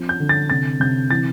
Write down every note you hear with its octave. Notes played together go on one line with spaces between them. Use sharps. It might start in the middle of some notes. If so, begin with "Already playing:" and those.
Already playing: F3 C4
G6
D3
A6
C3 A6
C3 G6
E3 A6